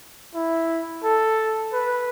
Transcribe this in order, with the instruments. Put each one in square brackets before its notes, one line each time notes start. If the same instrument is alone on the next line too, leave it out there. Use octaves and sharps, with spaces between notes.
[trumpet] E4
A4
B4